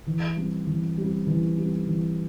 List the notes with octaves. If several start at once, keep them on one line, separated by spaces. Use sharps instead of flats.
E3
G3 C4
E3
G3 C4
E3
G3 C4
E3